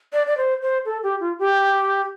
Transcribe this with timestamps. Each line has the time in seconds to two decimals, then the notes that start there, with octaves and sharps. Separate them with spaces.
0.13 D5
0.27 D5
0.37 C5
0.62 C5
0.85 A4
1.03 G4
1.20 F4
1.39 G4